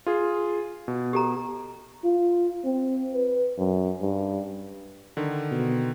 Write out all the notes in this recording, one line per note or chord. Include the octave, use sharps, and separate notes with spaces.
F4 G#4
B2
G4 A4 A#5
F4
C4
B4
F#2
G2
D3 D#3
B2